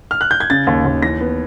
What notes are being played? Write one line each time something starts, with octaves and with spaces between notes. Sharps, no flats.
F6
F#6
G6
G#6
C#3 A6
D#2
D#2
E3 A#6
B3